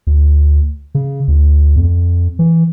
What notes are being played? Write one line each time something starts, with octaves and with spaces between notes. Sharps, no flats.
D2
C#3
D2
F2
E3